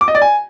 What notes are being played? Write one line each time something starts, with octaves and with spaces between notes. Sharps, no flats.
D6
D#5
D5
G#5